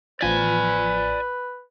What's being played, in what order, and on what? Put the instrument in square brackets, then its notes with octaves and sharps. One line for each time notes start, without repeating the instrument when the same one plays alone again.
[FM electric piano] A1 F3 B6 [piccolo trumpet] B4 [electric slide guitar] D5 G#5